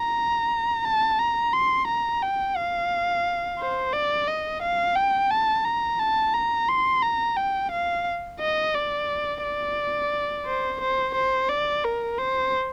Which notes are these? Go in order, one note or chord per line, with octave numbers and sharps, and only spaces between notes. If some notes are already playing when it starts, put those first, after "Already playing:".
Already playing: A#5
A5
A#5
C6
A#5
G5
F5
C5
D5
D#5
F5
G5
A5
A#5
A5
A#5
C6
A#5
G5
F5
D#5
D5
D5
C5
C5
C5
D5
A#4
C5